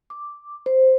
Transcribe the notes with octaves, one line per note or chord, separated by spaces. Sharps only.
D6
C5